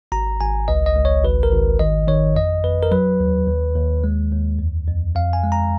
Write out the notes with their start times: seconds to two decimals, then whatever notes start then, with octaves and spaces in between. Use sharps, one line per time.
0.12 G#1 A#5
0.40 G#1 G#5
0.68 C#2 D#5
0.86 D#5
0.96 C#2
1.05 C#5
1.24 G#1 B4
1.43 A#4
1.52 G#1
1.79 D#3 D#5
2.07 D#3 C#5
2.35 F2 D#5
2.64 F2 B4
2.83 A#4
2.91 F#3 B4
3.20 D#2
3.47 D#2
3.75 D#2
4.04 G#3
4.32 D#2
4.59 F2
4.87 F2
5.15 F2 F5
5.33 G#5
5.43 G#3
5.52 A#5